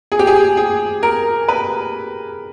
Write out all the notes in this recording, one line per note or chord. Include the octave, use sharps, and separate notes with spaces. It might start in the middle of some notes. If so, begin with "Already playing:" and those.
G#4
G4
G#4
G#4
A#4
B4